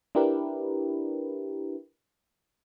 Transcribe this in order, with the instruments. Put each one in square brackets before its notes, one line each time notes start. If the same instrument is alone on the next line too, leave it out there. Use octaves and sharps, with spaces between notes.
[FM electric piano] D4 E4 G4 A#4 B4